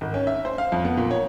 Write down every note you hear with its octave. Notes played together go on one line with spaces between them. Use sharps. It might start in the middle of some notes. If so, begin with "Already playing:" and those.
G#1
C#4
E5
C5
F5
F2
B3
A#2
C#5